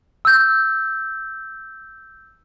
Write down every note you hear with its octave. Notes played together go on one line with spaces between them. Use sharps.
E6 G6